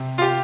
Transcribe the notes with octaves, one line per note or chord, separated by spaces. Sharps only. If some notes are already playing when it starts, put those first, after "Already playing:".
Already playing: C3
F4
G4